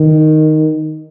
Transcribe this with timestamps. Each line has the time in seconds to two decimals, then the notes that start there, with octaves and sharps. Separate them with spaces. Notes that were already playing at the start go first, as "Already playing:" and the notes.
Already playing: D#3